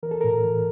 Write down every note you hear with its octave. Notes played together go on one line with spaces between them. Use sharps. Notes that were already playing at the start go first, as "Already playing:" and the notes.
E3 A#4
A4
A2 A#4
E3